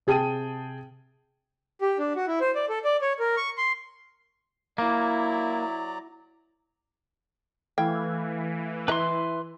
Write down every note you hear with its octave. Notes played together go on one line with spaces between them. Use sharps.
C3 G#4 G5 A5 D#7
G4
D4
F#4
E4
C5
D5
A4
D5
C#5
A#4
C#6
C6
F#3 A#3 E4 D5 A#5
E3 A3 F5 G5 G#6
E4 B4 D#5 A#5 C6